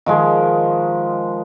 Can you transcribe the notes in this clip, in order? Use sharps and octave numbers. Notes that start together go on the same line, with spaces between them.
D#3 F3 G#3